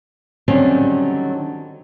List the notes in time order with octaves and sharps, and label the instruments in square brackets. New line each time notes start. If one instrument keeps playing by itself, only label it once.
[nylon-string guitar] D3 D#3 F#3 G3 C4 C#4